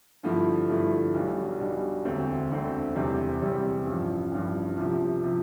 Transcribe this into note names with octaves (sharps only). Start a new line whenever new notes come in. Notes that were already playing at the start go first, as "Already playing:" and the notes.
G2 D3 F3 A3 E4
G2 D3 F3 A3 E4
B1 B2 G3 D4
B1 B2 G3 D4
E1 D2 D3 A3 C4
E1 D2 D3 A3 C4
E2 C3 G3 C4
E2 C3 G3 C4
A1 G2 F3
A1 G2 F3
C2 C3 F3
C3 F3